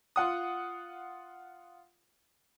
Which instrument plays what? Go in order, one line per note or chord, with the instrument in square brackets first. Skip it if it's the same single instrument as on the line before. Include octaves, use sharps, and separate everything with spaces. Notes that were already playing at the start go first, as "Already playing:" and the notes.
[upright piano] F4 F#5 D#6